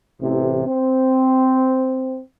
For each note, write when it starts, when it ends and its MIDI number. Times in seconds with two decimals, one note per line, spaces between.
0.21 0.62 33
0.21 0.62 48
0.66 2.20 60